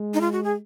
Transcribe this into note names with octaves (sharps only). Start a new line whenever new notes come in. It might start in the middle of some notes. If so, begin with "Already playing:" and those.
Already playing: G#3
D#4
F4
F#4
G#4